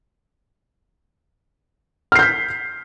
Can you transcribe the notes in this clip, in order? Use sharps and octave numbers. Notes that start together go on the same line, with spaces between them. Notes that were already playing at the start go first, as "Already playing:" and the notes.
F6 G6 B6 C7